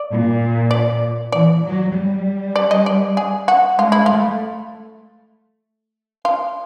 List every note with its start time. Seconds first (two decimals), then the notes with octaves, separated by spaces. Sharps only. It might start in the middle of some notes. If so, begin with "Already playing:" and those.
Already playing: D5
0.09 A#2
0.71 D5
1.32 E3 D5
1.63 F#3
1.94 G3
2.56 D5
2.71 D#5
2.86 D5
3.17 G#4
3.48 F#4
3.79 G#3 F4
3.92 E4
4.06 A3 F4
6.25 F4